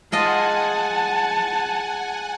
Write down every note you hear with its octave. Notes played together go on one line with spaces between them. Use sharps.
G#3 F4 D#5 F#5 G#5 A5